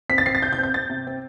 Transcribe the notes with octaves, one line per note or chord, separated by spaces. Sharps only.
C4 B6
A6
C4 C7
A6
C3 G6
G6
C4
G6
C4 A6
C3
C4